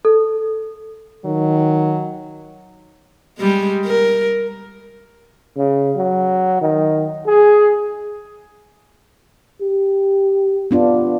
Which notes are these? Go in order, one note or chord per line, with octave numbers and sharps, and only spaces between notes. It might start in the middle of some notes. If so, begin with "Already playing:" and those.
A4
D#3 F#3
G3 G#3
A#4
C#3
F#3
D#3
G#4
G4
B3 D4 F4